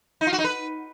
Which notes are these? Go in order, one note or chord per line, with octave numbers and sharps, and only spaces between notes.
D#4
F4
F#4
D#4
B4